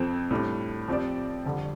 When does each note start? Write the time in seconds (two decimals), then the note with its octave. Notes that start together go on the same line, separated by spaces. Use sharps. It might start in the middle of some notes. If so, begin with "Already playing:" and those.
Already playing: F2 F3 C4 A4
0.31 A2 G3 D4
0.88 F3 C4 G4 D5
1.45 F2 D3 G3